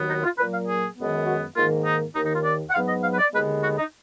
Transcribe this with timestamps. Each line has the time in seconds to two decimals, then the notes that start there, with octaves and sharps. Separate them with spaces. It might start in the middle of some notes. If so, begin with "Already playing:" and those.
Already playing: D#2 D#3 F#3 B3
0.09 D#4
0.24 F4
0.38 A#2 F#3 A#3 B4
0.52 F5
0.68 G#4
0.97 F#2 D#3 G#3 B3
1.26 F#4
1.56 G#2 D#3 A#3 F4
1.85 D#4
2.15 D#2 D#3 A#3 D#4
2.25 D#4
2.35 F4
2.45 D5
2.70 F#5
2.74 G#2 F#3 B3 F5
2.89 D#5
3.03 F5
3.14 B4
3.19 D5
3.33 D#2 D3 G#3 B3 B4
3.63 F#4
3.78 D#4